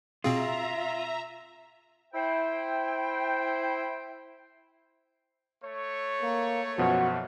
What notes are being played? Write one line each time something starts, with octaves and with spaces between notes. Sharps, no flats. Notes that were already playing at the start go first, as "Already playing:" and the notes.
B2 C4 F4 G#4 E5 A#5
E4 C5 G5
A3 C#5
A#3
F#2 B2 F3 F#4